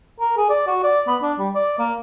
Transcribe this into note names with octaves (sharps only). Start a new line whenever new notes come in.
A#4
G#4
D5
F#4
D5
B3
D4
G3
D5
A#3